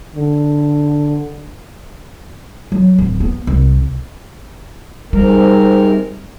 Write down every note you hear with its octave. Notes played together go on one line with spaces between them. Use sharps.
D3
F#3
D1
B3
C2
G#2 C3 G3 A#4